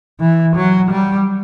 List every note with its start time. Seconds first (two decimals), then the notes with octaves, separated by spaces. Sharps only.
0.21 E3
0.56 F#3
0.91 G3